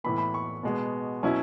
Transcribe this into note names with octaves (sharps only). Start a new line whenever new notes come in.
A2 E3 B3 B5
B5
C#6
B2 G#3 B3
B2 F#3 C#4 E4